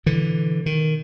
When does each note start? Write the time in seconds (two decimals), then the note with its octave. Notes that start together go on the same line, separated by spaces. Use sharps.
0.06 B2 D3 E3
0.66 D#3